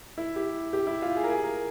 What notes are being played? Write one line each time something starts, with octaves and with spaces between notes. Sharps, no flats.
E4
G4
G4
E4
F4
G#4
A#4
G#4
A#4